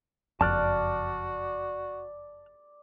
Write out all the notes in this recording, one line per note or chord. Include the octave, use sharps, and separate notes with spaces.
F#1 F2 F#4 D5 A5 F6 F#6